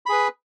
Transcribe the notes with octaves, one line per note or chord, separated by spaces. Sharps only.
G#4 B4 B5